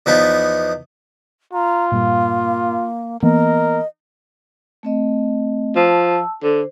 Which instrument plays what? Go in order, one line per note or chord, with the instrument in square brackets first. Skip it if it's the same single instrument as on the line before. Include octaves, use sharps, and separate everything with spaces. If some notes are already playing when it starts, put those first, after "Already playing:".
[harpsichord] E2 F3 B3 D#4
[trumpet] F4 [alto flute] A#5
[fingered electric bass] G2 A#2 [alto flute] A#3
[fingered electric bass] E3 A#3 B3 [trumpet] A#4 [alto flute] D#5
[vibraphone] A3 C4 D#5
[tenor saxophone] F3 [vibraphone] A5 E6
[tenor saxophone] D3 [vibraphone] C5